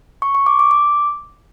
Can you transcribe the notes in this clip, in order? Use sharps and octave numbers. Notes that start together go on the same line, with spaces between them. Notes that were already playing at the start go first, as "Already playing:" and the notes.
C#6
C#6
D6
D6
D6